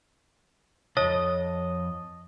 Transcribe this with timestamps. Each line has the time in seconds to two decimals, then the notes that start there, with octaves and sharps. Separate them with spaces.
0.97 C2 F2 C#5 D#5 A5